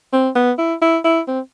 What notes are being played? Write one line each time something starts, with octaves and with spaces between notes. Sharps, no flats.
C4
B3
E4
E4
E4
C4